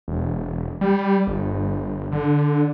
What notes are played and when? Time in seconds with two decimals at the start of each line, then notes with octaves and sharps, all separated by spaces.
0.08 E1
0.81 G3
1.27 G1
2.12 D3